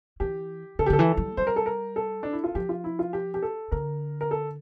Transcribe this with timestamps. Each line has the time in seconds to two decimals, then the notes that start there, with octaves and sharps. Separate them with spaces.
0.20 E3 G4
0.79 D3 A4
0.86 G4
0.90 D3 A4
0.99 E3
1.17 G3
1.37 G3 C5
1.47 A#4
1.56 A4
1.66 A#4
1.96 A4
2.23 D4
2.33 E4
2.44 F4
2.55 F3 G4
2.69 F4
2.84 E4
2.99 F4
3.13 G4
3.34 G4
3.42 A4
3.71 D3 A#4
4.21 A#4
4.31 A4